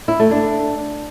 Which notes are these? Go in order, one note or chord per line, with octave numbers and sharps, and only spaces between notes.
E4
A3
D4